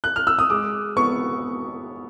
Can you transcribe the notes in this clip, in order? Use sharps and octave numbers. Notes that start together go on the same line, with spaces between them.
F#6
F6
E6
D#6
G#3 D6
B3 C#6